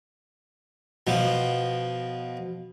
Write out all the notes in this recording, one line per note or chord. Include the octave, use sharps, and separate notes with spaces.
B2 F3